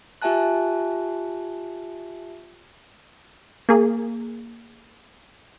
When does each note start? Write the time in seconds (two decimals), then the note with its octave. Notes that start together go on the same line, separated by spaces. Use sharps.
0.22 F4 G4 E5 G#5 A5 F#6
3.69 A#3 G#4